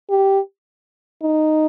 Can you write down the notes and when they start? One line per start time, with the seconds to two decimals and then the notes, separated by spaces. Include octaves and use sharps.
0.10 G4
1.22 D#4